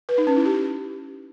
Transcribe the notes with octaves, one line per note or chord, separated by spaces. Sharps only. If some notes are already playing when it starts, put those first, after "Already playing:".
B4
D#4
C#4
E4
G4